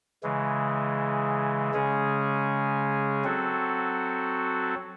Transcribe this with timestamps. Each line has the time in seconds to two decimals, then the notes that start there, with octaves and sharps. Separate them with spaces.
0.23 C#3 E3 G#3
1.73 C#3 G#3 C#4 G#4
3.24 F#3 C4 F#4 A4